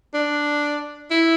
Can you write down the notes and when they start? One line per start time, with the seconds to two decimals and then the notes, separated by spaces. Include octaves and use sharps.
0.14 D4
1.11 E4